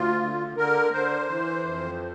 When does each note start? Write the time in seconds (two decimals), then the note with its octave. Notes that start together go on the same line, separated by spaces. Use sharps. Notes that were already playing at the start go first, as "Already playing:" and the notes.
Already playing: D2 F4
0.21 D3
0.57 D3 A#4
0.93 D3 C5
1.29 E3
1.65 F2